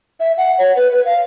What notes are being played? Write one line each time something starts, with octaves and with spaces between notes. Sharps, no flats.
E5
F#5
C#5
B4
B4
F5